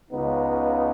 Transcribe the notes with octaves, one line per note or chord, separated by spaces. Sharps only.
C#2 C#3 B3 D#4